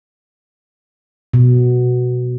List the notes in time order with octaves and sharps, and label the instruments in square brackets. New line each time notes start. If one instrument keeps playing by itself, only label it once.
[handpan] B2